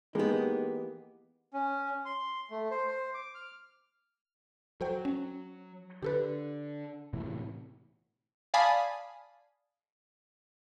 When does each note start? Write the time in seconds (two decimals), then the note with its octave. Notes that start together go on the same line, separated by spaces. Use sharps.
0.15 E3 G#3 A#3 B3 D#4 G4
1.54 C#4
2.05 C6
2.51 A3
2.71 C5
2.87 C5
3.14 D6
3.35 F6
4.81 F#3 A4 C5 G5
5.05 C#4
6.03 D3 G4 A4 B4
7.13 A2 C3 E3
8.54 D5 F5 G#5 A5 B5 D#6